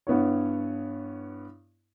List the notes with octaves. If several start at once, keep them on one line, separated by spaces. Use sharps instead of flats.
G2 B3 E4 C#5